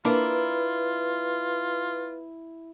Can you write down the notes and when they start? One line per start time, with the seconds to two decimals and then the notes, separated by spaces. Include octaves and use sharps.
0.05 A#3 D4 E4 F4 B4